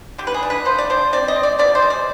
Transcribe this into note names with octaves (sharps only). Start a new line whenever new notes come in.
D3 G4
B4
G#4
D4
B4
F3 C5
D5
D4 C5
C4 D5
D#5
C4
D5
B2 D5
C5
G#3
D5